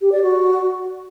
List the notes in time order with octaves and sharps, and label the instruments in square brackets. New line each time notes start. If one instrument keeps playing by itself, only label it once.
[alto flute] G4
D5
F#4